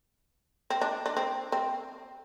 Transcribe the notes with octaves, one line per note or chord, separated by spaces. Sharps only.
C4
D4
D4
C4
C4